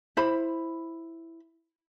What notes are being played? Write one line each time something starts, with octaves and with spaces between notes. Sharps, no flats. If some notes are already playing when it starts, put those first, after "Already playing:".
E4 C5 B5